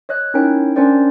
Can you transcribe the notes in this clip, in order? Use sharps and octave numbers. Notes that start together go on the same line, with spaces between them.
C#5 D#5 F#6
C#4 D#4 E4 A#4 C#5 G5
C#4 D4 A#4 C5 D5 G5